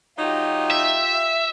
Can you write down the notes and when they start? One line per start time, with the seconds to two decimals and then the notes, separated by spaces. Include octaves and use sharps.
0.18 F#3 D#4 F4 G4
0.71 E5